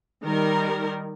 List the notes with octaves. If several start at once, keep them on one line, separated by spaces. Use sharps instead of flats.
D#3 G3 A#4